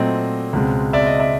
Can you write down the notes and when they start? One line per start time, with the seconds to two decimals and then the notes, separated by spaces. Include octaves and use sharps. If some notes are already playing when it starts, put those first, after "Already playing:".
Already playing: A#2 F#3 A3 C4 D#5
0.53 C#2 B2 G#3 C4
0.93 D5 E5
1.07 D#5
1.20 D5 E5